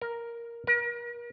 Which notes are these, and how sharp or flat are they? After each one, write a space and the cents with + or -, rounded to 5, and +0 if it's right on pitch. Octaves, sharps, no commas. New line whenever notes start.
A#4 +5
A#4 +40